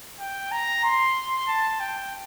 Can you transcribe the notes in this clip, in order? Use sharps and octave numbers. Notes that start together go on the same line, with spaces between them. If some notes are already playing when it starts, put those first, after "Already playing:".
G5
A#5
C6
A5
G5